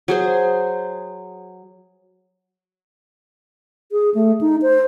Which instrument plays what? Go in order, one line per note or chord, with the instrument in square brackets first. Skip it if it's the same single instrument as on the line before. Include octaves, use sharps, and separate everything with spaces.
[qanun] F#3 G#4 C5
[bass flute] G#4
A3
D#4
C5